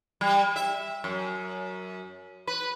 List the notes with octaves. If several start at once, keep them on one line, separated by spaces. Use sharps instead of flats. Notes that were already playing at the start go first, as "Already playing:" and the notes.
G3
E5
F#2
B4